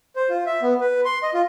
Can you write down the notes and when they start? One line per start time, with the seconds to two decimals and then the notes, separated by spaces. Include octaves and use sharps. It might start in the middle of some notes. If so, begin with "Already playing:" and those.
0.16 C5
0.29 F4
0.46 E5
0.62 B3
0.80 B4
1.05 C6
1.23 D#5
1.34 F4